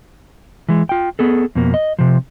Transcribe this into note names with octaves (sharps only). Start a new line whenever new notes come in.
E3 G#3
F4 G5
B3 G#4 A4
F2 B2 A#3
D#5
C3 F3